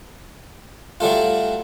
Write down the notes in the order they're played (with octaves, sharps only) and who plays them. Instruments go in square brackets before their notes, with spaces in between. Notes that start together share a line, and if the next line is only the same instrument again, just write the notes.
[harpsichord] F#3 G3 A3 F4